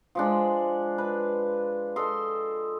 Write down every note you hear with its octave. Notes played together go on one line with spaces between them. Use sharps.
F3 G#3 D4
B4
A4 D#5 C6